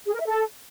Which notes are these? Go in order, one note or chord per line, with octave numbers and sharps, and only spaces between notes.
G#4
A#4
E5
A4